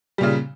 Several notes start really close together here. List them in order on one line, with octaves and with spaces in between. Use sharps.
G3 A#2 C#3